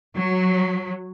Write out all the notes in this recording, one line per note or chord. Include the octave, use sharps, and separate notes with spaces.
F#3